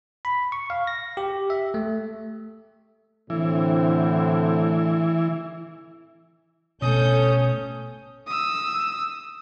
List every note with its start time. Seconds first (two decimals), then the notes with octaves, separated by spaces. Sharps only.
0.25 B5
0.52 C#6
0.70 F5
0.87 A#6
1.17 G4
1.50 E5
1.74 A3
3.30 A2 D3 E3 C4
6.82 G1 B2 A3 C#4 A4 D#6 G6
8.27 D#6 E6